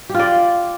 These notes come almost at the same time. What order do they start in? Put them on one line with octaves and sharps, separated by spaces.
G4 F4 D5